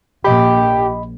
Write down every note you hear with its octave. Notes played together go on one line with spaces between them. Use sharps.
A#1 G4 D#5 B5